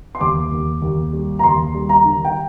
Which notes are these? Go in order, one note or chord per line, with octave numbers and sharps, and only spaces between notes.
C6
D#2 D6
D#2
D#2
G3
A#5
D#2 C6
G3
A#5
D#3
G5